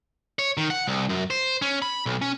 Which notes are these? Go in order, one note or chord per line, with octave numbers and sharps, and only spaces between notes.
C#5
D#3
F#5
C2
F#2
C5
C#4
B5
B1
C#4